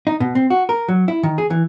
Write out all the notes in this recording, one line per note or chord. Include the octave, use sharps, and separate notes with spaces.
D#4
B2
C4
F#4
A#4
F#3
E4
D#3
G#4
E3